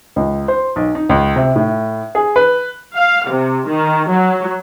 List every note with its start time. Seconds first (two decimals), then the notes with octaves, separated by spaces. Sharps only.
0.16 C#2
0.48 C5
0.76 B1
0.95 D#4
1.09 C#2
1.36 C3
1.56 A2
2.15 G#4
2.36 B4
2.94 F5
3.29 C3
3.68 D#3
4.08 F#3